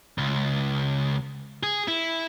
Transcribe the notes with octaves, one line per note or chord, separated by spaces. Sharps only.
C#2
G#4
E4